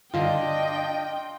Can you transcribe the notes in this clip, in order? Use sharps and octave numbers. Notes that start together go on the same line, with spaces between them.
G2 D3 D4 F4 D#5 G5